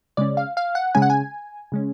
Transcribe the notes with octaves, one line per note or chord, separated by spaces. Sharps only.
C#3 G#3 C#4 D5
F5
F5
F#5
C#3 G#3 C#4 G#5
F#5
G#5
C#3 G#3 C#4